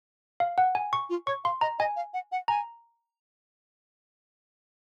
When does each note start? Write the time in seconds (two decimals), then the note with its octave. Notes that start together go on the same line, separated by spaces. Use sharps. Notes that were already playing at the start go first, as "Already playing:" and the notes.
0.40 F5
0.58 F#5
0.75 G#5
0.93 C#6
1.10 F4
1.27 C#5 C#6
1.44 F5 C6
1.61 D#5 A#5
1.79 D#5 G#5
1.96 F5
2.14 F#5
2.32 F#5
2.48 G#5 A#5